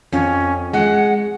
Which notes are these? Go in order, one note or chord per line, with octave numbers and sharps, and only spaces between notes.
F2 C#4
G#3 F#5